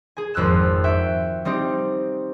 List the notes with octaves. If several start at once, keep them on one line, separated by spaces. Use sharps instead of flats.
G#4 G#5
G#1 F2 E6 F#6 E7
F#4 E5 G5
G3 C4 D#4 G4